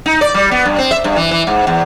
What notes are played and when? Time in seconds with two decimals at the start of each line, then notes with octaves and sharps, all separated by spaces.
0.06 D#4
0.21 D5
0.34 G3
0.51 B3
0.65 G2
0.78 C4
0.91 E5
1.04 G2
1.16 E3
1.31 E3
1.47 G#2
1.67 E2